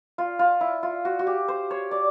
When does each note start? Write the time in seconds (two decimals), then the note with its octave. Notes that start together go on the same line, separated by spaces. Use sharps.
0.18 F4
0.39 F4
0.61 E4
0.83 F4
1.05 F#4
1.19 F#4
1.27 G4
1.48 C5
1.71 C#5
1.91 D5